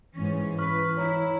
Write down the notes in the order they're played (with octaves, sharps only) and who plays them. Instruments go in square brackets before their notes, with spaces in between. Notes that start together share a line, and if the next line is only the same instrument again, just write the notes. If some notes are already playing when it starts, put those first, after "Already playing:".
[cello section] G#2 C#4 [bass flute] E3
[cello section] B4 [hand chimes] C#6 F6
[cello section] E4 [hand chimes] C#5 A#5